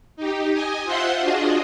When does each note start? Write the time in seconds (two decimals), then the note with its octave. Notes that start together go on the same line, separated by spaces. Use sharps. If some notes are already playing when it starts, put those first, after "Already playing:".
0.16 D#4 G4
0.52 D#5 G#5
0.84 F4 C5 E5 F#5 C6
1.19 D4 F4 F#4 G#4 D#5